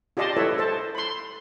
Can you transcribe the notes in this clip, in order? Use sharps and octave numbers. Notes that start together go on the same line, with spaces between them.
F4 G4 D5 D#5 A5 C6
E4 A4 B4 C#5 E5
A4 C5 A5
B5 C6